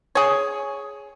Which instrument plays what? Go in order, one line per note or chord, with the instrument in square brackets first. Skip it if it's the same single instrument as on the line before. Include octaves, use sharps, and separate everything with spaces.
[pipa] G#4 C#5